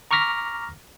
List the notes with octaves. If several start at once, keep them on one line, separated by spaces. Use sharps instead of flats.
A#5 C#6 D6 F6 A#6 B6